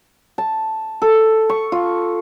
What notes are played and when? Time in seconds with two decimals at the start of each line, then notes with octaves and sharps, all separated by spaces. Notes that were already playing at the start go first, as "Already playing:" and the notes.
0.38 A5
1.02 A4
1.49 C#6
1.72 F4